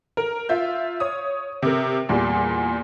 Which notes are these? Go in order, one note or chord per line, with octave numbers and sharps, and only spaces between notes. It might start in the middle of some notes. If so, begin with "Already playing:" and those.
A#4
F4 E5 G6
C#5 D#6
C3 A#4
E2 A#2 G3